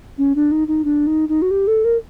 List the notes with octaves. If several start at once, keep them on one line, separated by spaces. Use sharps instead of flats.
C#4
D4
D#4
D#4
D4
D#4
D#4
F#4
G4
A4
A#4